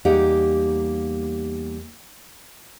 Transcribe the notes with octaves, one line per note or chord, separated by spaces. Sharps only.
E2 G3 A#3 D#4 G4 F#5